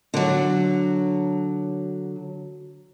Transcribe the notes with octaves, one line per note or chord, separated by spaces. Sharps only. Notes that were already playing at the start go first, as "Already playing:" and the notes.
D3 F#3